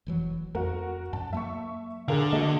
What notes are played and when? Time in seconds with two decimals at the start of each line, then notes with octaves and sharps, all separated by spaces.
0.07 F1 E3 F#3
0.55 F2 A3 F#4 A#4
1.13 F#2 A5
1.33 F#3 A#3 E5 C#6
2.08 D3 G#4 A#4 F5
2.33 A3 A#3 F#4 D#5